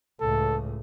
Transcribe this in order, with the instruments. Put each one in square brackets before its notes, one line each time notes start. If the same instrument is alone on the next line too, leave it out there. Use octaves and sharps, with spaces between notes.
[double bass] C#2 A2 [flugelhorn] A4